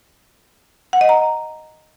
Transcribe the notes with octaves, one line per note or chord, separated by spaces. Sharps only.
F#5
D#5
A#5